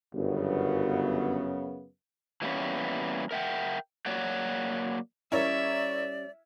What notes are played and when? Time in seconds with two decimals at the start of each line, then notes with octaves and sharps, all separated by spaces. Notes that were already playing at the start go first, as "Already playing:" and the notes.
0.15 G1 F#2 C#3 B3
2.42 E3 G3 A#3 B3 C#4
3.31 A#4 E5 F#5 G5
4.06 F#3 A#3 C#5 D5 F#5
5.32 G3 C#4 E4 A#4 C#5 D5 E5